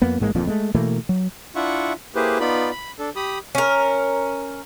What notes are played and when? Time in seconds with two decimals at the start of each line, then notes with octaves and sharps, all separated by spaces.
0.02 F2 A#3 B3
0.20 A1 G#2 G#3 A#3
0.35 D1 F2 A#2 F3
0.47 G#3 A3
0.75 B2 E3 A3 A#3
1.09 F#3
1.55 D4 E4 F4 E5 F#5 C#6
2.15 A#3 E4 G4 G#4 B4 C5
2.40 B3 D#4 F4 D5 B5
2.71 B5
2.99 D4 A4
3.16 G4 B5 D#6
3.55 C#4 A#4